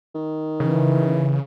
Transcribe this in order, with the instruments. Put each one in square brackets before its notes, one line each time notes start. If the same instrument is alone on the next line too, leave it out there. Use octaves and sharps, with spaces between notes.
[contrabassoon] D#3
[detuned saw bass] C#3 [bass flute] E3